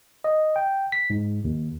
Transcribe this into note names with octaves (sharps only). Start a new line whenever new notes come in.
D#5
G5
B6
G#2
D#2